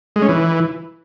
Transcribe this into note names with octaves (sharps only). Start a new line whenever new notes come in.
G#3
C#4
E3